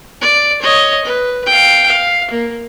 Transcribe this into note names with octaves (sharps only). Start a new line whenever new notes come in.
D5
C#5 D#5
B4
F5 G5
F5
A#3